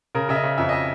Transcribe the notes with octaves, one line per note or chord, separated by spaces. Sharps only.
C#3 A#4
C#3 E5
D#5
C#3
F2 E5
D#5
E5